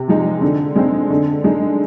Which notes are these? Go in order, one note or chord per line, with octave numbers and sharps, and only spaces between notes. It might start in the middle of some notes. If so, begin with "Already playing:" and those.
Already playing: C3
F3 G#3 D#4
D3
G#3 C4 D#4
D3
G#3 D#4